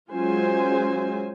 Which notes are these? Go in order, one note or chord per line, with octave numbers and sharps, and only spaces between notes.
F#3 G#3 C#4 F4 C5 G#5